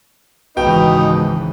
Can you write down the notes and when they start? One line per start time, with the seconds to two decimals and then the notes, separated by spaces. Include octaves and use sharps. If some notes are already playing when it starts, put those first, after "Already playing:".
0.57 G#1 C#2 B2 E3 D#4 B4 G5